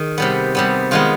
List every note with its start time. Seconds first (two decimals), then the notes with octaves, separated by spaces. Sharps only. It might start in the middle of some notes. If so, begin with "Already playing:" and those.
Already playing: D#3 G#4
0.18 C3 G3 B3
0.55 C3 G3 B3
0.91 D#3 G#3 B3 F4